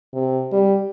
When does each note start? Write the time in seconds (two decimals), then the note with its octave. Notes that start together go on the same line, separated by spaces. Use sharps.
0.14 C3
0.52 G3